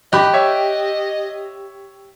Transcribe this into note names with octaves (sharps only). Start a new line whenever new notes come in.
G4 D#5 B5 F#6
C#5 E5